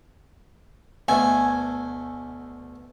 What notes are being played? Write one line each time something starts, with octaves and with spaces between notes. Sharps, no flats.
D2 B2 A3 G#5